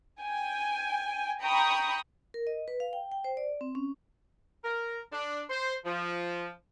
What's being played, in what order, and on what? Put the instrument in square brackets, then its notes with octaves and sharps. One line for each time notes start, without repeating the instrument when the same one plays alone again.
[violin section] G5 G#5
G5 A#5 B5 C#6 D#6
[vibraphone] A#4
D#5
B4
F5
G5
G5
C5
D5
C4
C#4
[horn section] A#4
D4
C5
F3